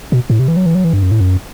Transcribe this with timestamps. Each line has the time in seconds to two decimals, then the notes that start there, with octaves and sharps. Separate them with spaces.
0.12 B2
0.30 A2
0.39 C3
0.48 E3
0.57 F#3
0.66 E3
0.75 F#3
0.84 E3
0.93 G2
1.03 F#2
1.11 A2
1.21 F#2